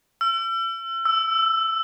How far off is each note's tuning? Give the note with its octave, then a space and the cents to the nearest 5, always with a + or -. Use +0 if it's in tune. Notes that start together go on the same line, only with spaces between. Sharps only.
E6 +40
E6 +5